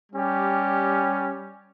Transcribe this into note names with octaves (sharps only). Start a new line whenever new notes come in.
G3 C#4 G4